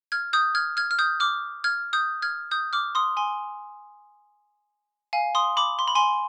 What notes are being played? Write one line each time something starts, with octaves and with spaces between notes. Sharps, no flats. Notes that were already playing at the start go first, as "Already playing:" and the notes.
F6 G#6
D#6 G6
F6 G#6
F6 G#6
F6
D#6 G6
D6 F6
F6 G#6
D#6 G6
F6 G#6
D#6 G6
D6 F6
C6 D#6
G#5 C6
F5 G#5
C6 D#6
B5 D6
C6
B5
G#5 C6